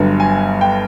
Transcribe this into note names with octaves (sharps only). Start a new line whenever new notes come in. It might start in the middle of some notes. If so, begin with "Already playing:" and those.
Already playing: G1 G2 D3 F#3
G#5
G5